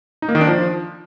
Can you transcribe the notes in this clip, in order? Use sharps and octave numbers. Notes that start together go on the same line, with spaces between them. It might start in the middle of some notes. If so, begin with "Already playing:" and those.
D#4
A#3
D#3
D4
F3